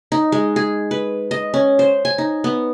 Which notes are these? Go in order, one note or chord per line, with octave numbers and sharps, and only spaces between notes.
D#4
G#3
G#4
B4
D#5
C#4
C5
G#5
D#4
B3